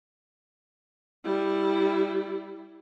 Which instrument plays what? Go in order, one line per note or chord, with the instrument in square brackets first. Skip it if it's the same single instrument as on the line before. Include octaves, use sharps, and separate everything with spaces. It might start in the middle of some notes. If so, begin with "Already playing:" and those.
[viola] G3 E4